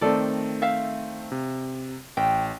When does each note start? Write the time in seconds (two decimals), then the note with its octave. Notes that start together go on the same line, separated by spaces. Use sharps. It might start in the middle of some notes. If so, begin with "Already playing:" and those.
0.01 D#3 A3 C4 A4 D5
0.62 E5 F5
1.32 C3
2.17 A1 G5